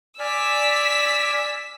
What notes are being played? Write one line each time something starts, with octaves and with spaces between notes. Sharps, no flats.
D5 G#5 E6 F6 B6